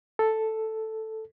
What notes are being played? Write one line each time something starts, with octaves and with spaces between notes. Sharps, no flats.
A4